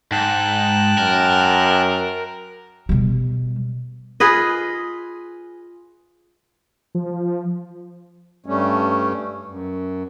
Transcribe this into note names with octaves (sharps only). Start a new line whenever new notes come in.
G#2 G5 A5 F#6
F#2 A#4
B2 G3
F4 G#4 B4 D#5
F3
G2 G3 A3 C#4
F#2